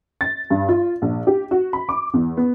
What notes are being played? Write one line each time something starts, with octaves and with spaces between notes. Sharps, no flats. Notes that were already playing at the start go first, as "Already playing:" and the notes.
A6
G2
F4
A#1
G4
F#4
B5
D6
E2
B3